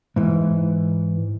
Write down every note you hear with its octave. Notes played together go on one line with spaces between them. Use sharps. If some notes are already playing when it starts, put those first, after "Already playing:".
G#2 E3